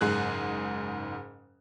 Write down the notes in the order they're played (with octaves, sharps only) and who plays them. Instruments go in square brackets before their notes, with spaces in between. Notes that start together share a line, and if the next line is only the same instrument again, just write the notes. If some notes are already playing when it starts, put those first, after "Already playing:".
[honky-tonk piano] F#1 G#2 G#4 F#6